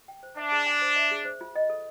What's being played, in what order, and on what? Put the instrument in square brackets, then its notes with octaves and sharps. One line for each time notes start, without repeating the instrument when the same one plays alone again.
[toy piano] G5
C5
[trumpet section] D4 [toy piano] E5
[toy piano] G#4
G#5
C5
E5
G#4
C5
F4
D#5
A4